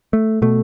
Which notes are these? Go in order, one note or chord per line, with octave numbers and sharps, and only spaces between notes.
A3
B2 A3